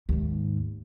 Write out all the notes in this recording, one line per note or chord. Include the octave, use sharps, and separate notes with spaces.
D#2 G#2